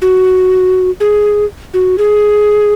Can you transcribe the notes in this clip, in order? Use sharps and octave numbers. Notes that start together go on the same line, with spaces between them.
F#4
G#4
F#4
G#4